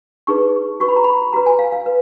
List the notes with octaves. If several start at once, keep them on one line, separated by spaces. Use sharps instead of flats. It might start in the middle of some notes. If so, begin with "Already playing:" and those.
D#4 G#4 B4 C#6
F#4 B4 C#6
B5
A#5
B5
F#4 B4 A#5
G#5
F5
F5
B4